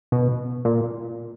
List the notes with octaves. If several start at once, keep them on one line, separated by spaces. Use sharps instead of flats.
B2
A#2